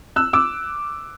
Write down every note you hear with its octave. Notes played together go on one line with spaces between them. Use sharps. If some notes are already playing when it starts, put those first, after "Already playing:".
E6 F#6
D6 E6